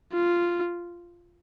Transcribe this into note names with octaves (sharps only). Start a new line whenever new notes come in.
F4